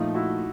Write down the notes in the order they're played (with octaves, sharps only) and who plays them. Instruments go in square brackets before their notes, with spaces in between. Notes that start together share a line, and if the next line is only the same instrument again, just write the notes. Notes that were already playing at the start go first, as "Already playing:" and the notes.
Already playing: [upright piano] A#2 F3 A3 [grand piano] D#4 F4
[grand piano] E4 F#4